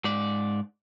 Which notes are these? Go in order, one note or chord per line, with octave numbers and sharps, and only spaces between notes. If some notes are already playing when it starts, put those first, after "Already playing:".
G#2 D5